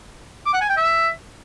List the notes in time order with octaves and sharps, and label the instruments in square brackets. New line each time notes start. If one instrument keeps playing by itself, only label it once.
[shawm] D6
F#5
G#5
G5
E5